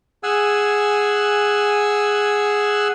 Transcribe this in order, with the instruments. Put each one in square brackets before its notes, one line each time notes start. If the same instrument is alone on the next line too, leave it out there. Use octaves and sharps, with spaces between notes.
[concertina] G#4 F#5 G#5 E6